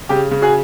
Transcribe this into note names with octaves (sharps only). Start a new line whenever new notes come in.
C#3 G4
C#3
F#4 G#4